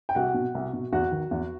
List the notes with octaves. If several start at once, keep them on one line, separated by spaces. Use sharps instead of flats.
G5
C2 F#4 F#5
B2
C2
B2
E2 F#4 F#5
D#3
E2